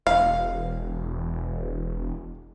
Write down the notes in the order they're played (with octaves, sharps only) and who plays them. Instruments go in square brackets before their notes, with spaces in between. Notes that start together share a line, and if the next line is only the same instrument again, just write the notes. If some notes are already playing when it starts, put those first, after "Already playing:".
[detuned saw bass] E1 [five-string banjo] F5